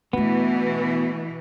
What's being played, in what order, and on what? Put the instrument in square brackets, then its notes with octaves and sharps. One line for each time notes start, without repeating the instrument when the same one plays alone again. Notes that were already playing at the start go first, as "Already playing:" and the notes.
[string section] B2 E3 [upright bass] A3 D4 [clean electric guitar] B3